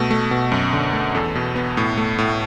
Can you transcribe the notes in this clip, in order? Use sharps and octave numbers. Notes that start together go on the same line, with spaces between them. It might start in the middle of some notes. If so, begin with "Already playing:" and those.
Already playing: B2 A3
A3
B2
F#2
D3
A3
E2 A4
B2
B3
A2
A3
A2